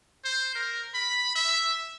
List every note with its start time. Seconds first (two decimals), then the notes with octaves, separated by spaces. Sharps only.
0.25 C5
0.55 A#4
0.94 B5
1.35 E5